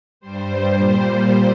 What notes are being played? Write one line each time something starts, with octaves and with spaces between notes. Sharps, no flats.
G2 G3 C5
A#2 G3 C5